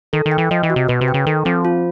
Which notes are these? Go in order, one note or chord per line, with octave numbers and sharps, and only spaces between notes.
D#3 A4
D#3
G5
E3
F3 D#5
E3
F#4
C3
B2 B4
C3
G5
C#3
D#3 A4
F3 C4
F4